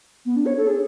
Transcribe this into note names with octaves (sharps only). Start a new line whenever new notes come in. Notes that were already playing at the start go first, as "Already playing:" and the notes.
B3
D4
C#5
A4
G#4